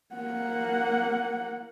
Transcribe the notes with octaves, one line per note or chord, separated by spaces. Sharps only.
A#3 F#5